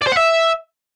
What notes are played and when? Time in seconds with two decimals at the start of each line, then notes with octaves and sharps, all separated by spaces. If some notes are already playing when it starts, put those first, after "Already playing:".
0.02 D5
0.07 C5
0.12 F#5
0.17 E5